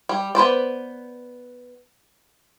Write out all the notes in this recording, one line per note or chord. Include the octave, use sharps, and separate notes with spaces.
G3
B3 B4 C5 D5